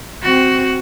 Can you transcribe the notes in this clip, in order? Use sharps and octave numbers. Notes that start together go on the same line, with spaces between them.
C4 F#4